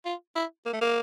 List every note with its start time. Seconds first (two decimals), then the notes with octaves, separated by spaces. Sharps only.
0.05 F4
0.35 E4
0.66 A#3
0.73 A3
0.81 A#3